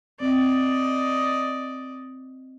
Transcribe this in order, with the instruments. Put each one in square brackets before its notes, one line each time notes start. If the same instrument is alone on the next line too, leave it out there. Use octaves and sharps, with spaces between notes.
[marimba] C4 [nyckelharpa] D5 D#5